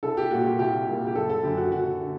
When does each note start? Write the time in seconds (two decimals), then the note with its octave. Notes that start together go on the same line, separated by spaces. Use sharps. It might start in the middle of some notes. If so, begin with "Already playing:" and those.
0.03 C2 A4
0.17 G4
0.31 A#2 G3 A#3 F#4
0.45 G4
0.59 C2 G4
0.87 A#2 G3 A#3
1.07 G4
1.15 F#1 A4
1.29 A4
1.43 F#2 D3 G4
1.57 F#4
1.71 F#1 F#4
2.01 D3